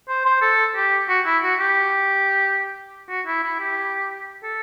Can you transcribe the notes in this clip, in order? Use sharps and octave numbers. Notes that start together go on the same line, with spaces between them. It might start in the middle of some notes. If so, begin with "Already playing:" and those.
C5
C5
A4
G4
F#4
E4
F#4
G4
F#4
E4
E4
G4
A4